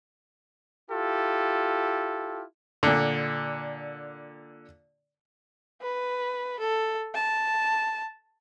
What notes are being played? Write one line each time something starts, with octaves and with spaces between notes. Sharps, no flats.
E4 F4 G4 A4
A#2 D3
B4
A4
A5